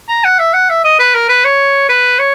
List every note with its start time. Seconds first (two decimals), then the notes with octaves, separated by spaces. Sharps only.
0.09 A#5
0.24 F#5
0.39 E5
0.54 F#5
0.70 E5
0.85 D#5
1.00 B4
1.15 A#4
1.29 B4
1.45 C#5
1.89 B4
2.19 C#5